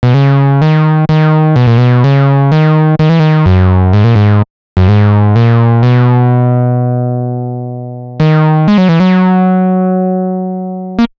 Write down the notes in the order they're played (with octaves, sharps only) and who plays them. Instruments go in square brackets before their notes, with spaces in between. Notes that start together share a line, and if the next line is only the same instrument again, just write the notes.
[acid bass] B2
C#3
D#3
D#3
B2
A#2
B2
C#3
D#3
D#3
E3
D#3
F#2
G#2
A#2
G#2
F#2
G#2
A#2
B2
D#3
G#3
F#3
E3
F#3
A#3